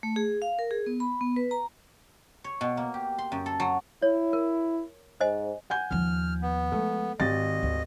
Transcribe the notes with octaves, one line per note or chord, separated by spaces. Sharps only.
A3
G#4
F5
A#4
G#4
B3
B5
B3
B4
A#5
C#5
B2
A#3
G4
C6
F#2
A4
F#3
E4 C#5
A#4
G#2 C5 D#5 G#5
F#5 G#5 G6
D#2 F3 F6
B3
F3 G#3 A3
G#1 D#3 G4 D#5 A6
D2